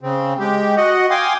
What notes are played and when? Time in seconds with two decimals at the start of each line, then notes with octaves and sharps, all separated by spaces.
0.01 C#3 C4
0.39 G#3 G4
0.77 F#4 D#5 F#5
1.11 F5 G5 G#5 C6 D6 D#6